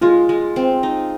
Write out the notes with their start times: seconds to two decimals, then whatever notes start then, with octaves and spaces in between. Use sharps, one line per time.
0.01 G#3 F4
0.29 G#3
0.56 C4
0.83 D#4